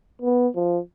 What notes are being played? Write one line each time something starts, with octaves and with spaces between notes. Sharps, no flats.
B3
F3